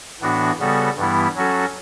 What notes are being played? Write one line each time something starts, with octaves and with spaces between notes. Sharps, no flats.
A2 E3 B3 D4 F#4
C#3 G3 B3 F#4 A4
G2 E3 G3 B3 E4
F#3 C#4 F#4 A4